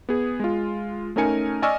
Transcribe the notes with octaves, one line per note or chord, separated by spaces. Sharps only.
B3 G#4
G#3 F4
A3 C#4 D#4 A#4 G#5 C#7
D5 D#5 G#5 C#6 E6 F6